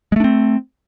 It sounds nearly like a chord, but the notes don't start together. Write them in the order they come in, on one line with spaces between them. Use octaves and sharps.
G#3 A3 D4 C4